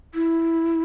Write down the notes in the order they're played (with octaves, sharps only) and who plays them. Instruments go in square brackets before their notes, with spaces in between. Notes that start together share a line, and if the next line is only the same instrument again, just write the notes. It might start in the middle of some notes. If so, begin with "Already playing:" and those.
[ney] E4